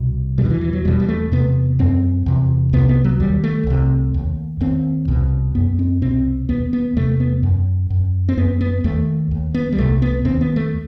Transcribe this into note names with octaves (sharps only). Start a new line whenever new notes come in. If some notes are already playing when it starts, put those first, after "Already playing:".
Already playing: C2 B2
E2 B2 D#3 G3
E3
E3
F#3
E2 B2 G3
G3
A3
E2 C3 B3
F#2 C4
E2 C3
C2 C3 B3
B3
F#3
D#2 G3
A3
C2 C3
D#2
D#2 C4
C2 B2
F#2 B3
C4
C2 B2 C4
D#2 B3
B3
E2 C3 A3
B3
F#2
F#2
C4
F#2 B3
B3
D#2 A3
D#2
B3
G3
C2 C3 A3
B3
D#2 C4
B3
A3